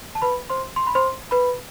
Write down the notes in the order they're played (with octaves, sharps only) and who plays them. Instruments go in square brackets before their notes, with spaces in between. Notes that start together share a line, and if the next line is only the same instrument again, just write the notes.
[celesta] A5
B4 B5
C5 C6
C6
B5
C5 C6
B4 B5